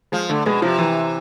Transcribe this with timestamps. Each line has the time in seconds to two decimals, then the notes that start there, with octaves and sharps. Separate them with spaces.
0.12 F3 G#3
0.29 D3 A3
0.46 B2 G#3
0.62 C3 F3
0.79 E3